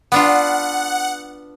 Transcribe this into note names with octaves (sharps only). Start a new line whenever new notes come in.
B3 D4 F4 F#5